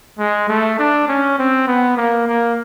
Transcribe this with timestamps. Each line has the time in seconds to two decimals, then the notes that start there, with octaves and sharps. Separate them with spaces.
0.19 G#3
0.49 A3
0.79 D4
1.08 C#4
1.39 C4
1.67 B3
1.97 A#3
2.28 A#3